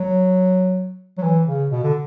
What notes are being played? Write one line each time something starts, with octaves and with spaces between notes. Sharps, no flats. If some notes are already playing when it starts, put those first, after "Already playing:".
Already playing: F#3
F#3
E3
C#3
B2
D3